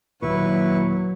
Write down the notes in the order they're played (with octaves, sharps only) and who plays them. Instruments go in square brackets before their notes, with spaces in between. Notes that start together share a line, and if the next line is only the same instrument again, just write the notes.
[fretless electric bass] D#2 A#2 [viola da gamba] F#3 [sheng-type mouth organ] E4 B4 C#6